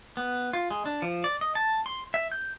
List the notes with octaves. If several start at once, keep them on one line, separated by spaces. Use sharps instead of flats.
B3
F4
G#3
D4
F3
D5
D#5
A5
C6
E5
G6